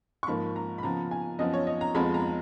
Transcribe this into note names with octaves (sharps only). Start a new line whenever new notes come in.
C#6
G#2 F3 A#3 B5
A#5
B5
C#3 F3 B3 A#5
G#5
F#2 F3 B3 D#5
C#5
D#5
A#5
F2 F3 G#3 B3 B5
A#5